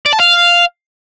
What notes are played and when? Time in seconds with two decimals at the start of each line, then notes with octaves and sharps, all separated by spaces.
0.06 D5
0.13 A5
0.20 F5